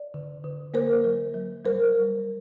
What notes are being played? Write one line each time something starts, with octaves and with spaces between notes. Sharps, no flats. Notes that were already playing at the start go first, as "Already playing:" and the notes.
Already playing: D5
D3
D3
A#3 A#4 C5
F#3
F#3
G3 A#4 C5